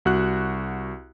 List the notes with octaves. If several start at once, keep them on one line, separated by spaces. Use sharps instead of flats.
C2 F#4 F#6